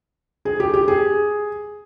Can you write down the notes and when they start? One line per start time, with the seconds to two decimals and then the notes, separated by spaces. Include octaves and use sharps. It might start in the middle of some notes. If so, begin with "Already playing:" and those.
0.45 G#4
0.60 G4
0.74 G4
0.88 G#4